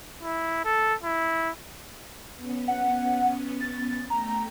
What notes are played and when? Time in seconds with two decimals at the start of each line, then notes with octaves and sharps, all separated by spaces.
0.23 E4
0.65 A4
1.04 E4
2.37 B3 C#4
2.68 F#5
3.60 A6
4.10 A3 G5 A#5